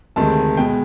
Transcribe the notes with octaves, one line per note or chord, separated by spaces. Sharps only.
D2 C3 D#3 G#3 A5
B2 G#3 G5